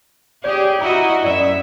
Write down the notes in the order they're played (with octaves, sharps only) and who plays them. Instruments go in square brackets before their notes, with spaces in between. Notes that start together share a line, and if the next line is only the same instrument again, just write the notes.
[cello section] G4 G#4 [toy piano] C#5 D5
[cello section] E4 F#4 D#5 [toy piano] A#5
[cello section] F#2 E5 [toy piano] D5